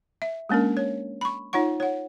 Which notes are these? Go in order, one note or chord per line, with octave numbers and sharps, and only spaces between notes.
E5
G#3 A#3 C#4 D4 A#4
C#5
B5 C#6
D#4 F4 C#5 F#5 C#6
C#5 F#5